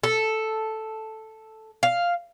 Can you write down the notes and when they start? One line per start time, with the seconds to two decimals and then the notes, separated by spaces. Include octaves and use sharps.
0.04 A4
1.83 F5